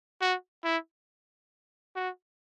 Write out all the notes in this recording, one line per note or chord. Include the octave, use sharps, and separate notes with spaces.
F#4
E4
F#4